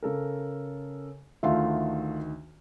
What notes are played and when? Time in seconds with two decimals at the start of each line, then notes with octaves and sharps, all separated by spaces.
0.02 C#3 A4 A#4
1.43 D2 D#3 A3 F4 E5